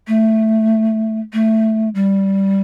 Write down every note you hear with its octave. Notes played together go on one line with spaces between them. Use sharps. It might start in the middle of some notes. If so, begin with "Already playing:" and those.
A3
A3
G3